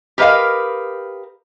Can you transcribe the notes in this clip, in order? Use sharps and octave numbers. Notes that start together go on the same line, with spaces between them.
G4 A#4 B4 D#5 F5